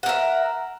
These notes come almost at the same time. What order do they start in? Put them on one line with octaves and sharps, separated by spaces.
F#5 A#4 E5